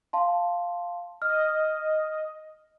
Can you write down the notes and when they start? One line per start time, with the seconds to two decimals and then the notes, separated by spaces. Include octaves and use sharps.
0.13 F5 A5 C6
1.22 D#5 F6